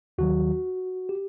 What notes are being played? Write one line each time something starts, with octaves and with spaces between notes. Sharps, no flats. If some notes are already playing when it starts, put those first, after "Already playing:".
D#2 D#3 F#3 F#4
G4